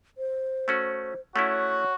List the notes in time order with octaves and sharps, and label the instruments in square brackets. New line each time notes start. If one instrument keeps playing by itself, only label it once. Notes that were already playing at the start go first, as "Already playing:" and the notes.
[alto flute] C5
[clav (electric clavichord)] A3 C#4 F#4
[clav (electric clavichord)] A3 C#4 E4 [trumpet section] F#4 [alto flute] C#5